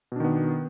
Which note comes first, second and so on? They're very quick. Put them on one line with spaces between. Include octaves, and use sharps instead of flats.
B2 D4 D#3 B3